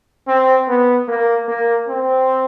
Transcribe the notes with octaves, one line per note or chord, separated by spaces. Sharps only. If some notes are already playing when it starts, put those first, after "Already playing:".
C4
B3
A#3
A#3
C4